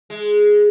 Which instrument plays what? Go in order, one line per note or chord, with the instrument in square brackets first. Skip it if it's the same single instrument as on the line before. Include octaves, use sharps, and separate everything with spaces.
[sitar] G#3